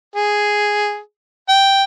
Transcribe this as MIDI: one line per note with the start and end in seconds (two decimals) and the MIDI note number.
0.16 0.99 68
1.49 1.84 79